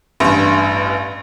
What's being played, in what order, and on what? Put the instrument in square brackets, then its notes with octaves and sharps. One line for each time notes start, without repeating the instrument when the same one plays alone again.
[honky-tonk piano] A1 G2